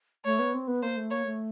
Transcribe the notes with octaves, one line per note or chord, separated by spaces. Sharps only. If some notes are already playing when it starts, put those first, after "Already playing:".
A3 C#5
B3
C4
B3
A#3 C5
A3
A#3 C#5
A3